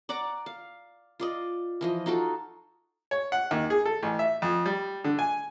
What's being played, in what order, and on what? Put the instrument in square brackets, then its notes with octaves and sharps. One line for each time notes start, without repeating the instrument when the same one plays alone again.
[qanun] D5 F#5 A#5 D6
F5
F4 D5 D#5
E3 F3 D#5
D#4 F4 F#4 A4
[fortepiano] C#5
F#5
D#2
G#4
A4
A1
E5
F2
G3
D3
G#5